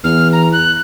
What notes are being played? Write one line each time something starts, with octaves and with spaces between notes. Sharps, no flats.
E2 F6
A#5
F#6